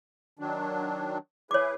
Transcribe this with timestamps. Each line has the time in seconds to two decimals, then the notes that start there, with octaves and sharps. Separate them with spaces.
0.39 D#3 F#3 D4
1.51 E4 G#4 B4 C#5 D6